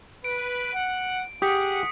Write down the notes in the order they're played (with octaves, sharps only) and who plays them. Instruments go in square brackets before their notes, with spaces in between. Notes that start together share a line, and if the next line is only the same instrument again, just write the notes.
[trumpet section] B4 [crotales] D7
[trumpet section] F#5
[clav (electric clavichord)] G4 [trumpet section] G#4 F#5 [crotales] D#6 B6 C#7